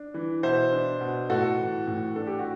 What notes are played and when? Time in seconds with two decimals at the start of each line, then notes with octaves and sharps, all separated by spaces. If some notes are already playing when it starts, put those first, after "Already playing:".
Already playing: D4
0.14 E3
0.43 B2 C5 E5
0.72 D4
1.01 B2
1.29 A2 F#4 A4
1.59 E3
1.87 A2
2.16 D4 A4
2.27 G4
2.39 F#4